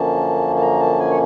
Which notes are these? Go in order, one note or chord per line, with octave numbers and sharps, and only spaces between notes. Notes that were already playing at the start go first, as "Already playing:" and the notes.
Already playing: F#2 D3 F3 A#3 C#4 A5
A5
A#5
A5
G#5
C#5